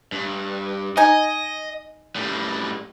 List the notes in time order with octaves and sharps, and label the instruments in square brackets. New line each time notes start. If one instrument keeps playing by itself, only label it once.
[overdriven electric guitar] G2
[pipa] D#4 G#5 [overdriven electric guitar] D#5
[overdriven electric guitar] A2 G3